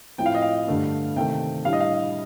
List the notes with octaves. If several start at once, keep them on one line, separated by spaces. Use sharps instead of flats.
A2 F3 C4 G5
F5
D#5
F5
G2 D3 A3 D4
C3 D#3 A3 G5
A2 G3 D4 F5
D#5
F5